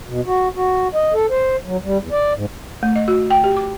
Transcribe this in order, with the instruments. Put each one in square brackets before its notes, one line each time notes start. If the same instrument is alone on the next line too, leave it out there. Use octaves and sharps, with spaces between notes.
[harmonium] B2
F#4
F#4
D#5
A4
C5
F#3
G3
E2
D5
G#2
[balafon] A3
D#5
F#4
G5
G4
D6